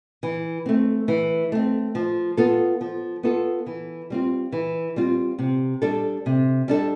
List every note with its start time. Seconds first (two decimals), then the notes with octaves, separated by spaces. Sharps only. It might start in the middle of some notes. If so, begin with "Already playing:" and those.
0.23 E3
0.66 A3 C4
1.08 E3
1.52 A3 C4
1.95 F3
2.37 B3 F4 A4
2.81 F3
3.23 B3 F4 A4
3.66 E3
4.10 G3 C4 F4
4.53 E3
4.96 G3 C4 F4
5.39 C3
5.82 G3 D4 A4
6.26 C3
6.68 G3 D4 A4